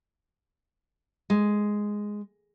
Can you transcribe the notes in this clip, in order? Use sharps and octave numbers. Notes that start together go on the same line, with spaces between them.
G#3